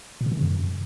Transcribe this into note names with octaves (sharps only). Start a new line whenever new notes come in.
A#2
C3
D#3
C#3
F#2